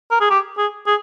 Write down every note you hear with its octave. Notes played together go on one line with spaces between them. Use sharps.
A#4
G#4
G4
G#4
G#4